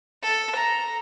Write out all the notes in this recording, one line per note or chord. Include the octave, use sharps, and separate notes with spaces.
A4
A#5